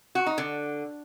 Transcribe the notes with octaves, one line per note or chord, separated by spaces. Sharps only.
F#4
D#4
D3